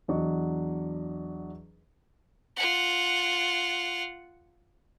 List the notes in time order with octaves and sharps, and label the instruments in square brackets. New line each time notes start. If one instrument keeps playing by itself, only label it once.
[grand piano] E2 F#3 D4 D#5 C#6
[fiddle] F4 F#5